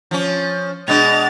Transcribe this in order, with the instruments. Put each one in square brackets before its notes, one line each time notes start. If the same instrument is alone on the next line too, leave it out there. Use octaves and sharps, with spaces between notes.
[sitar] F3 C#4
[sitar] B2 G#3 D4 [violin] A6 F7